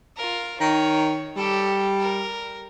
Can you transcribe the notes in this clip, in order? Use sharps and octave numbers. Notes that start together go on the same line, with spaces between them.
F4 A#4
D#3 C#5
G3 G4 A4
A#4